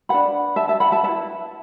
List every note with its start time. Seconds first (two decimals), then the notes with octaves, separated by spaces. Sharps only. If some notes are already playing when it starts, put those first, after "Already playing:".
0.09 D4 B4 F#5 B5
0.56 E5 A5
0.68 E5 A5
0.80 F#5 B5
0.92 E5 A5
1.03 B4 E5 A5
1.08 E4